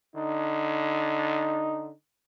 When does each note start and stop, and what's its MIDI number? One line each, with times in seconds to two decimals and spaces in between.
0.15 1.91 50
0.15 1.93 63